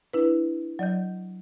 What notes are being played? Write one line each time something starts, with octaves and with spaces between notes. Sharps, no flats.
D4 E4 B4
F#3 D5 D#5 G6